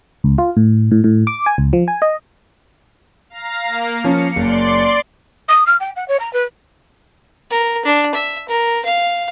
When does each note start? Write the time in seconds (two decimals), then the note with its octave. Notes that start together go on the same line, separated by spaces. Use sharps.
0.24 C#2
0.38 F4
0.57 A2
0.91 A2
1.04 A2
1.27 D6
1.46 G#5
1.58 C#2
1.73 F3
1.88 G#5
2.02 D#5
3.30 F5 A#5
3.65 A#3
4.04 F3 C#4 C#7
4.36 F#1 D5 C6
5.48 D#6
5.66 F6
5.80 G5
5.96 F#5
6.08 C#5
6.19 A#5
6.33 B4
7.51 A#4
7.85 D4
8.15 E5
8.48 A#4
8.85 F5